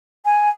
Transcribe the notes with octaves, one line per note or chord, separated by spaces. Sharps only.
G#5